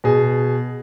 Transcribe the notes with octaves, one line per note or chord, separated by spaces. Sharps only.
B2 G#4